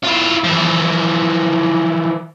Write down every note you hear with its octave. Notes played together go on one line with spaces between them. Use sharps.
E4 F4
E3 F3